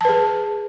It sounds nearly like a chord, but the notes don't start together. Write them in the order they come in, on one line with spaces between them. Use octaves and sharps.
A5 B4 G#4